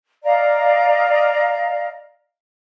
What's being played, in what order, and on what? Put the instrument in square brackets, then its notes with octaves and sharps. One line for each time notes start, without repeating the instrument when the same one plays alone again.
[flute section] D5 D#5 F5 A#5